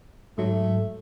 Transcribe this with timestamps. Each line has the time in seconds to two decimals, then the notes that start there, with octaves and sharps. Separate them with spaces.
0.38 G#2 F#3 A3